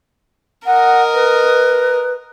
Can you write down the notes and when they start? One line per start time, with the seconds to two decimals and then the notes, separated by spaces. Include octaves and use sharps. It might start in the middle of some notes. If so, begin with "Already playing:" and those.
0.66 A#4 D#5 F#5
1.13 B4